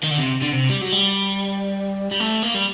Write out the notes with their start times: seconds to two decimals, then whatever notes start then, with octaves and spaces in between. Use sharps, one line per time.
0.04 D#3
0.11 D3
0.20 C3
0.42 D3
0.53 C3
0.69 G3
0.81 F#3
0.92 G3
2.11 G3
2.20 A3
2.43 A#3
2.55 G3